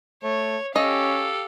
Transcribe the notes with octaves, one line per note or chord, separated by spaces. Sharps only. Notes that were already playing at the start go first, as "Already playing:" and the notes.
A3 C#5
C#4 G4 A4 D#5 F5